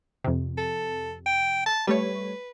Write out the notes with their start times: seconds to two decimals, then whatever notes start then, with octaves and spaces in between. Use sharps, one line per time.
0.24 F2 C3
0.58 A4
1.26 G5
1.66 A5
1.87 G3 A3 B4 C#5